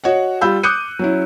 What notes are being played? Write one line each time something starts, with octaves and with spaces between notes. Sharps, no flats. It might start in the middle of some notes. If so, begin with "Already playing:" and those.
F#4 C#5 D#5 F#5
G3 F4 B5 E6 G6
D6 D#6 F#6 G6 C#7 D#7
F#3 C#4 E4